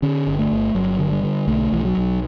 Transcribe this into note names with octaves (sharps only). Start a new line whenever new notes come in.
D3 C#4
G1
A3
G1
G1 F#3
D3
G3
D3
B1 A3
B1 E3
F#3
B1